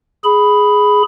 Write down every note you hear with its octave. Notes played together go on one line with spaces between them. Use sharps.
G#4 B5